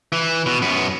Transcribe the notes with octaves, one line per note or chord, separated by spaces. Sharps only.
E3
B2
F#2 B3